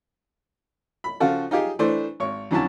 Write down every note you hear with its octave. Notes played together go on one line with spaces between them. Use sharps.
B5
C#3 F3 F4 F#4 A4
D#4 F4 G4 G#4
E3 A3 D4 E4 C5
G#1 C#5
F2 D3 F#3 C#4 E4 A5